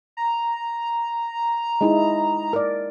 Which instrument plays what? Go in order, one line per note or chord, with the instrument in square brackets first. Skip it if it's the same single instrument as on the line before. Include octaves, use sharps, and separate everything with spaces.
[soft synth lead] A#5
[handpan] G#3 D#4 E4
A#4 D5